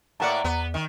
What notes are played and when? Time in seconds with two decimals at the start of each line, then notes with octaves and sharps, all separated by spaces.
0.20 A2 A#3 D5 F#5 A5 A#5
0.45 E2 B3
0.74 D#3